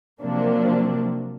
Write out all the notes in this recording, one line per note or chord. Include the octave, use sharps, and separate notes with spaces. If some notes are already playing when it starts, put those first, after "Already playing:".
C3 F3 F#3 A#3 D4